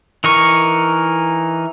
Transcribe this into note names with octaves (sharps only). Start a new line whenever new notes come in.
E3 D#4 A#4 C#6